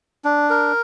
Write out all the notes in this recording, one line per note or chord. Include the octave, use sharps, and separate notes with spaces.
D4
A#4